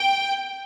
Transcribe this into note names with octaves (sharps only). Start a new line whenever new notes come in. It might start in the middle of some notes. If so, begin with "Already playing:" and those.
Already playing: G5